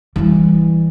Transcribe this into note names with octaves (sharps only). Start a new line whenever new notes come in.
E3 G3